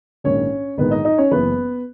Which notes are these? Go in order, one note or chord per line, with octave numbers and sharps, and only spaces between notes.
A#1 G#2 D#3 C#4 C#5
A#1 G#2 D#3 B3 B4
D#4 D#5
D#4 D#5
C#4 C#5
F#1 F#2 E3 B3 B4